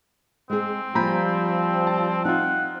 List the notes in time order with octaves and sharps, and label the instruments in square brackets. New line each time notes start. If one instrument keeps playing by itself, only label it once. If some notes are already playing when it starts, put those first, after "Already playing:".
[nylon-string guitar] G#3 G#4 [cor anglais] C4
[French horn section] F3 G3 [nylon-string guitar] A#3 F4 G#5 [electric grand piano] A#5 B5 G6
[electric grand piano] A5
[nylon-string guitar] C4 [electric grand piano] D#4 F4 [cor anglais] F#5